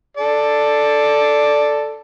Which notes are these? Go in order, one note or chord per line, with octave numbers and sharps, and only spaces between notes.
A4 D5